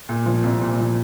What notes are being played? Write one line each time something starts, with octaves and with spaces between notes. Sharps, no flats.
A#2
F3
C2
A#2
F3